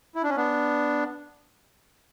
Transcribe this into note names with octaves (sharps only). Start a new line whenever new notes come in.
E4
D4
C#4
B3 D4